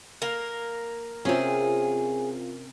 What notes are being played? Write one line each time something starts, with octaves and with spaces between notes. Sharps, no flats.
A#3 A#4
C3 C4 C#4 F4 G#4